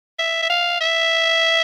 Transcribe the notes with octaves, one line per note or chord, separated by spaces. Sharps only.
E5
E5
F5
E5